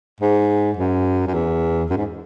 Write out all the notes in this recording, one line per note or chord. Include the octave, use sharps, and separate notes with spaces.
G#2
F#2
F#2
E2
F#2
G#2